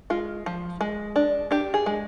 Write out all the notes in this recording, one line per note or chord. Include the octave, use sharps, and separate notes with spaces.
G#3 F4
F3
G#3
D4
D4 G4
G#4
G#3